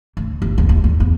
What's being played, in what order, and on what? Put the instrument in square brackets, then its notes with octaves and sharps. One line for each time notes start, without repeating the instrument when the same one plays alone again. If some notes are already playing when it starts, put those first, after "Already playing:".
[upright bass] D2
G1
D2
D#2
F2
E2